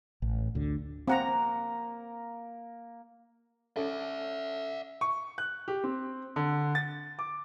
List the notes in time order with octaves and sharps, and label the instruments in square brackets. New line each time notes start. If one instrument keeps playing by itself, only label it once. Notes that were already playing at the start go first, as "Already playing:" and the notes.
[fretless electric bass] A1
D2 D3
[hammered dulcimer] A#3 A#4 [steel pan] C4 F#5 A#5
[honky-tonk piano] C#4 A4 [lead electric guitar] D5 E5
[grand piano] C#6
F#6
G4
C4
D3
A6
D6